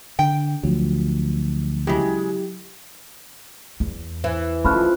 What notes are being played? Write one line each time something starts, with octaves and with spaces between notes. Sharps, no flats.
D3 G5
D2 F3 F#3
C#3 F#3 G#3 E4 G4
E2
E3
F3 G#3 A3 C#4 B5 F6 F#6